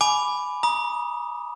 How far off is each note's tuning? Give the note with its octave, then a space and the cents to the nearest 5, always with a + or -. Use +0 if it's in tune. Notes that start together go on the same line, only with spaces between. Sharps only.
G#5 +20 B5 +0 D6 +0
A#5 +40 D#6 +0